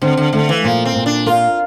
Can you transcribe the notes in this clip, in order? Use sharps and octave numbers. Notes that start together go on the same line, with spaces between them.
D3 C4
D3
D3 A3
E3
A#2 F3
C4
A#2
D4
F4 A#4